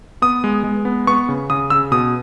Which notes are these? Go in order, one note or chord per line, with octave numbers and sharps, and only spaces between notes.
B3 D#6
G#3
G#3
B3
B3 C#6
C#3
C#3 D#6
C#3 E6
B2 D#6